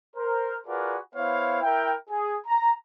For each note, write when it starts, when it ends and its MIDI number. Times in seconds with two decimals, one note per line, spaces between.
0.16 0.57 70
0.16 0.57 72
0.67 0.97 65
0.67 0.97 66
0.67 0.97 68
0.67 0.97 70
0.67 0.97 71
0.67 0.97 74
1.15 1.60 59
1.15 1.60 64
1.15 1.60 72
1.15 1.60 73
1.15 1.60 77
1.63 1.93 64
1.63 1.93 70
1.63 1.93 76
1.63 1.93 79
2.10 2.35 68
2.46 2.73 82